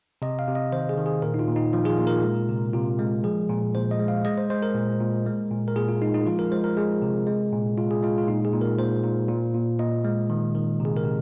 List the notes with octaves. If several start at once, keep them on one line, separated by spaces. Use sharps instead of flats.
C3 D#5
F5
C3
D#5
D#3 C5
G#4
D#3
G#4
A#2 A#4
D#4
F4
A#2
D#4
F3 F4
G#4
F4
A#2
A#4
G#3
C3
C3 F4
G#3
F3 G#4
A#2
A#2 C5
D#5
G#3
F5
G#3 D#5
C5
G#3 C5
A#4
A#2
A#2
G#3
A#2
A#4
A#2 G#4
F4
G#3 D#4
D#4
F3 F4
A#4
G#3 C5
A#4
G#3 G#4
C3
G#3
A#2
G#3 F4
G#4
G#3 F4
F4
A#2 D#4
G#4
A#2
A#4
A#2 C5
A#2
A#2
A#2
A#2 D#5
G#3
D#3
D#3
C3 G#4
A#4
C3